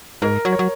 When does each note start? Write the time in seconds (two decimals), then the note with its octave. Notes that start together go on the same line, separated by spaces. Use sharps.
0.22 G#2 A#4
0.45 F#3
0.52 C#5
0.59 F#3